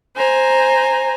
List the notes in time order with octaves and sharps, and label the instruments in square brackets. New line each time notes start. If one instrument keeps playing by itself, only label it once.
[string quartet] C5 G#5 A#5